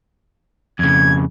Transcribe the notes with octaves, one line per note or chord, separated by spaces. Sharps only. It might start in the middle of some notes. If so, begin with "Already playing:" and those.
F2 C#3 G#6